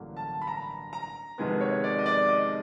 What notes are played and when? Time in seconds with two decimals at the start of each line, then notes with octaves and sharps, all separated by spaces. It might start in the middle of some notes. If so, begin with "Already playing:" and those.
Already playing: A1 G2 D3 F#3 A#3
0.16 A5
0.41 B5
0.47 A#5
0.93 A#5
1.38 F2 C3 D#3 G#3 B3
1.61 C#5
1.84 D5
1.98 D#5
2.06 D5
2.29 D#5